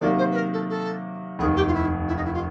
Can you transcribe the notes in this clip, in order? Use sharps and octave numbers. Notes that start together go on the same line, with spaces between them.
C3 D#3 F#3 A#3 D5
C5
B4
A#4
A4
A4
F1 D#2 D#3 G#4
G4
F4
E4
E4
D#4
E4
F4